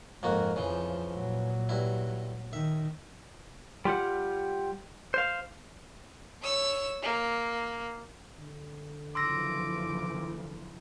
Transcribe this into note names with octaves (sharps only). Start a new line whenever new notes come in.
F#1 F2 G#2 A#3 F#4
F2 C#3 E3 F3
A#2 F#3
G2 E4
D#3 E5
G3 F4 G4 F#5
C5 F5
C#5 E6
A#3
D3
F#1 E3 F3 C6 D6 E6 A#6